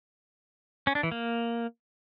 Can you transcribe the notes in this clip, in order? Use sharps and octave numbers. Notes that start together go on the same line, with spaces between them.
C#4
D4
E3
A#3